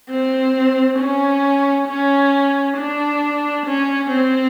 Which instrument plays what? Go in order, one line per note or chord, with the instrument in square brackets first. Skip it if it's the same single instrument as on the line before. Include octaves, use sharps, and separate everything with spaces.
[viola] C4
C#4
C#4
D4
C#4
C4